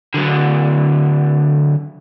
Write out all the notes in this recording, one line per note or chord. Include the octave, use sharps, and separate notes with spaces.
D3 F#3